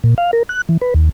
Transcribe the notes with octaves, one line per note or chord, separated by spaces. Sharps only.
A#2
F5
A#4
F#6
E3
B4
D#2